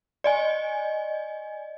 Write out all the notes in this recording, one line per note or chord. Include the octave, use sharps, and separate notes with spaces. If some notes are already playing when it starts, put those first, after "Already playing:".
D5 D#5 G#5